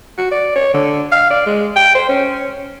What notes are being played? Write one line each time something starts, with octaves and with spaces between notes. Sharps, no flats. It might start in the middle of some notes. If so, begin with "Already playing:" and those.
F#4
D5
C#5
D3
F5
D5
G#3
G5
C5
C#4